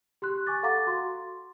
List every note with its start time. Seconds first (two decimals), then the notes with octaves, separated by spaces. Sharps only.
0.22 G4 C6 F#6
0.47 G#5 C#6 D6 A6
0.63 A4 F5 F#5 A#5 D6 A6
0.87 F#4 C6